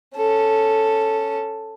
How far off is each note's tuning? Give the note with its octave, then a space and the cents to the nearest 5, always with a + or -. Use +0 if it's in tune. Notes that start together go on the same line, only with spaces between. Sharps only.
C#4 +0 A4 +0